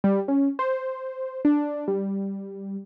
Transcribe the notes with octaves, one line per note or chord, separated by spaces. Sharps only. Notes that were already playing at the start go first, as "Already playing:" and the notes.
G3
C#4
C5
D4
G3